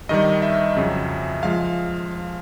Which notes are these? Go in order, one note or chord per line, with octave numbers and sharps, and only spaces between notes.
G2 D#3 G3 D#5
E5
F2 C#3 F#3
F3 G#3 F5